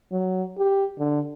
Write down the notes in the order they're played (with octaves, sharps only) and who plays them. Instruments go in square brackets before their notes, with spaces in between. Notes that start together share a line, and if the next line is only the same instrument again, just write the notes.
[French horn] F#3
G4
D3